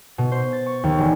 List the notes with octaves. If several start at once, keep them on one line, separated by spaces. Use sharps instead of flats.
B2
C5
A6
C#6
D#2
E1